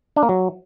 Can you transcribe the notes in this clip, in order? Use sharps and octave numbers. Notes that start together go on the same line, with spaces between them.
D4
A#3
F#3